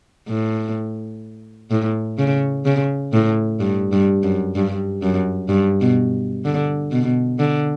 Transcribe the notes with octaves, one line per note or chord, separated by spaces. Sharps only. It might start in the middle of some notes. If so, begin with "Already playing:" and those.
A2
A2
C#3
C#3
A2
G2
G2
F#2
G2
F#2
G2
B2
D3
B2
D3